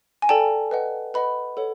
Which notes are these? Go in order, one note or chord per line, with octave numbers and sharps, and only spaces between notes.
G#5
A4 D5 G5 A5
B4 D#5 F#5
B4 D#5 F#5 B5
A4 C#5 F#5